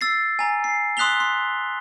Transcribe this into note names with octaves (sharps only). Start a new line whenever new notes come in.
E6 A6 C7
G#5 A#5
C7
C6 D#6 F#6 B6 F7 G7
C6